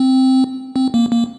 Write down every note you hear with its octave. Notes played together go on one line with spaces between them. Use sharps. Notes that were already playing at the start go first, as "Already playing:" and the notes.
Already playing: C4
C4
A#3
A#3